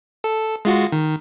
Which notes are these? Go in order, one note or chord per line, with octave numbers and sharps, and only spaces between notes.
A4
G#3 F4 F#4
D#3